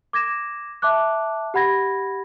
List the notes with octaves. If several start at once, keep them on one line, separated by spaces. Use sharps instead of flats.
D6 G#6 A#6 E7
E5 A5 D6 F#6
G4 F#5 B5 G#6 A#6